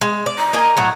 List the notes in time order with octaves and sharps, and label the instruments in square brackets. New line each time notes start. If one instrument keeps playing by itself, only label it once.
[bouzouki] G#3
D5
[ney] A#5
[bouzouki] A#3 D#5 G#5
A2 F#3